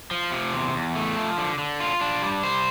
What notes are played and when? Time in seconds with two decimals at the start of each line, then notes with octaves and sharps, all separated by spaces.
0.11 F3
0.32 C3
0.53 E2
0.74 E2
0.95 A3
1.16 F3
1.38 D3
1.59 D3
1.80 F4
2.01 D4
2.22 G3
2.43 C5